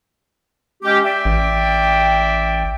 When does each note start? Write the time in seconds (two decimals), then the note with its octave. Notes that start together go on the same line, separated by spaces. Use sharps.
0.83 G#3 C#4 G4
1.05 D5 E5 G5
1.25 A1